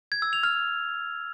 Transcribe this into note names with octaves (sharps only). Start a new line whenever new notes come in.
G#6
E6
F7
F6